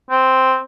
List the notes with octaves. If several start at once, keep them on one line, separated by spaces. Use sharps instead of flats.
C4